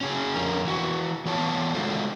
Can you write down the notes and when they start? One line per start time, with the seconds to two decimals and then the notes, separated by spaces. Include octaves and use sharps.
0.01 C#4 F#4 G#4
0.35 F2 D3 F3 A#4
0.65 E3 F#4
1.25 E3 B3 F4 C#5 A5
1.74 G#3 D#4 F#4 A4 C5